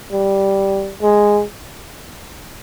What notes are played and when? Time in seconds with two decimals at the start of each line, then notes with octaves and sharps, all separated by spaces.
0.12 G3
1.02 G#3